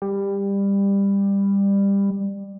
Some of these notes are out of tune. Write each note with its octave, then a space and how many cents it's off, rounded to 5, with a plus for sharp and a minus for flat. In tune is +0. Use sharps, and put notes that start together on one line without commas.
G3 +20